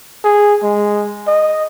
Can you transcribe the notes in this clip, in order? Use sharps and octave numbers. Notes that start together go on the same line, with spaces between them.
G#4
G#3
D#5